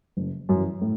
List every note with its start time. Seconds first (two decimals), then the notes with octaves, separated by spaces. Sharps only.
0.17 F#1
0.49 F#2
0.54 E3
0.81 A2